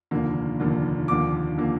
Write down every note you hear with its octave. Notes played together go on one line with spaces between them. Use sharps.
F1 D#2 D3 F3 A#3
F1 D#2 D3 F3 A#3
D#2 D3 F3 A#3 D6
D3 F3 A#3